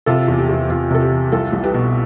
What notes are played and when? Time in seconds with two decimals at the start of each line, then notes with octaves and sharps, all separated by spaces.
0.06 C3 F4 A4
0.28 E2
0.39 G4
0.49 E2
0.70 C3 F4
0.91 C3 A4
1.01 G4
1.12 E3
1.32 C2 F4 A4
1.53 C2
1.63 G4 B4
1.74 B2